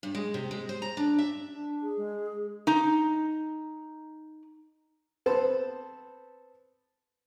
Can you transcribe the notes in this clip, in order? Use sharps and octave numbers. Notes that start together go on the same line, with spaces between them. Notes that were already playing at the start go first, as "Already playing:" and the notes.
G2
G#3
C3
G#3
C5
A#5
D4
E5
D4
G#4
G#3
D#4 A#5
B3 C4 A4 B4 C5 A5